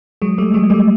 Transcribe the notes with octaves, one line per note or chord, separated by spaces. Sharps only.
F#3 G#3
G3 A3
F#3 G#3
G3 A3